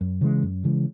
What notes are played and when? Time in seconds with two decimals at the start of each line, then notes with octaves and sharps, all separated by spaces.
0.01 F#2
0.21 C#3 E3 G#3
0.43 F#2
0.64 C#3 E3 G#3